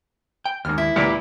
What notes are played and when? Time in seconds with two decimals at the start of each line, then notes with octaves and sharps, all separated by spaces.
0.46 G5
0.65 D#2 G#2 F6
0.78 E4
0.96 C#2 A#2 E3 G4 D5